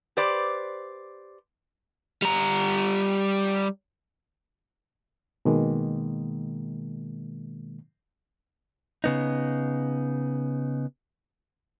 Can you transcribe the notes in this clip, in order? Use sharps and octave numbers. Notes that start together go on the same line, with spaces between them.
G4 B4 C5 D5
G3 A#5
B2 D#3 G#3 A#3
C#3 B3 D#4